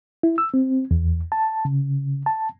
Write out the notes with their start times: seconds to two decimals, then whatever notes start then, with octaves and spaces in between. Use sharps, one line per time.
0.23 E4
0.38 E6
0.54 C4
0.91 E2
1.32 A5
1.65 C#3
2.26 A5